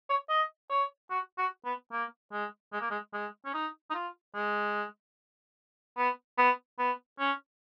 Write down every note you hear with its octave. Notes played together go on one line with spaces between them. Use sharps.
C#5
D#5
C#5
F#4
F#4
B3
A#3
G#3
G#3
A#3
G#3
G#3
C#4
D#4
D#4
F4
G#3
B3
B3
B3
C#4